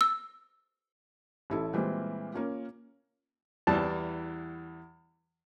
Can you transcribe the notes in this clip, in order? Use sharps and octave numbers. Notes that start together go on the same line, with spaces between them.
E6
A1 E4 A4
A#2 E3 G3 G#3 C4
A#3 C#4 F4
E2 E3 G3 A5